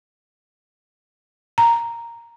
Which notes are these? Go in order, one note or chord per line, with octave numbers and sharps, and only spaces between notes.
A#5